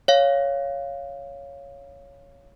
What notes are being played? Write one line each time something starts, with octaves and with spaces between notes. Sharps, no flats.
C#5 F5